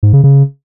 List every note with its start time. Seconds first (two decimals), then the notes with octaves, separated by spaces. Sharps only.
0.03 G#2
0.13 C#3
0.24 C#3